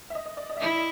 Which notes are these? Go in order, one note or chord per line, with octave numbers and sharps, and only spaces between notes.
E5
D#5
D#5
D5
D#5
E5
E4 D#5